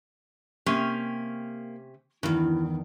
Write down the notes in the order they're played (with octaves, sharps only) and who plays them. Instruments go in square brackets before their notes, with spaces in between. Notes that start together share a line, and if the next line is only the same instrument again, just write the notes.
[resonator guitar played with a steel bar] C3 C#4 G4 [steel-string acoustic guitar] A#3
[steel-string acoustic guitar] E2 D#3 [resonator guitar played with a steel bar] G2 [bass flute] E4